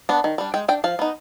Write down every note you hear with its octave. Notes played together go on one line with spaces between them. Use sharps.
B3 D4
D#3
G3 D4
G#3 G5
D4 G5
F3 F5
B3 D#4